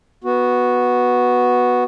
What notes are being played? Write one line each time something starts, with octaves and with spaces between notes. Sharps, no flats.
B3 F#4